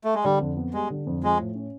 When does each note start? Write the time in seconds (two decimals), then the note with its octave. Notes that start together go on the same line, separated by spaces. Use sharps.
0.04 A3
0.15 G#3
0.24 D3 G3
0.41 F2
0.57 B3
0.73 G3 G#3
0.90 D3
1.07 F2
1.23 F3 G#3
1.39 A2
1.55 C#4